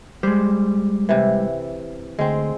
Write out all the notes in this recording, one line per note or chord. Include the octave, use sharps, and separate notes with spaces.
G3 G#3 C5
C3 E3
D2 G#3 C4